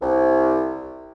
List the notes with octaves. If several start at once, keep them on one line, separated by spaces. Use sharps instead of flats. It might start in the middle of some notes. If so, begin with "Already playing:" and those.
C2